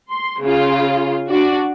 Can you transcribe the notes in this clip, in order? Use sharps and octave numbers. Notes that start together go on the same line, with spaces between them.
C6
C#3 F4
D4 F#4 D5